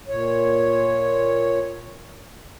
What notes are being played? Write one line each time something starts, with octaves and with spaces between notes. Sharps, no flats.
A#2 C#5